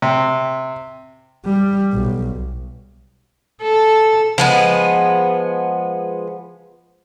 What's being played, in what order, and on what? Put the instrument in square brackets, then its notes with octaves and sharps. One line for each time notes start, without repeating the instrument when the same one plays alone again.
[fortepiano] C3
[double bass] G3
B1
[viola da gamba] A4
[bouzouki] F3 G#3 B3